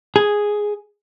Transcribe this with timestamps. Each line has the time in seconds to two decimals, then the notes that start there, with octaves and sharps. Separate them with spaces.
0.16 G#4